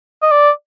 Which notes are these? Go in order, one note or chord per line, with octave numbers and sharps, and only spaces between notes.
D#5
D5